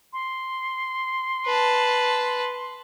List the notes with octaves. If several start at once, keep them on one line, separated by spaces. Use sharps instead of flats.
C6
B4 A5